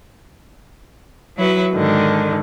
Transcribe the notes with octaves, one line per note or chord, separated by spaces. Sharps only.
F#3 E4 B4
G#2 D3 D#3